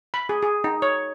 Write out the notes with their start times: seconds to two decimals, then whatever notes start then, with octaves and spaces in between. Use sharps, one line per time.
0.14 B5
0.29 G#4
0.43 G#4
0.64 D#4
0.82 C#5